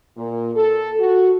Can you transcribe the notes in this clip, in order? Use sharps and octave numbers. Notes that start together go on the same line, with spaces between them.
A#2
A4
F#4